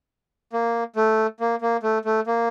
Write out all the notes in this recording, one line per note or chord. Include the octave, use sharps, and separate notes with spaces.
A#3
A3
A#3
A#3
A3
A3
A#3